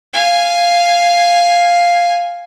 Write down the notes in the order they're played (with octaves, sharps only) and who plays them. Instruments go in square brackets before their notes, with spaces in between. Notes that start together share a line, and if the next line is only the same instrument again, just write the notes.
[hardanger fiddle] F5 G#5